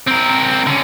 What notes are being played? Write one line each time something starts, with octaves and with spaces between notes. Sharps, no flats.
C4 A#4
D3 C#4